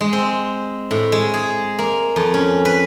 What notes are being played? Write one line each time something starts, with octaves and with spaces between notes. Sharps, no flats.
G#3
C4
A2
G#3
G#4
A#3
F2
C#4
B4